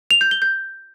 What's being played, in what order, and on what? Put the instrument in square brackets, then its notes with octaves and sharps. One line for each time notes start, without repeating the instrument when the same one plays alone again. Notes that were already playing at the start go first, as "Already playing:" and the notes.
[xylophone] F7
G6
G7
G6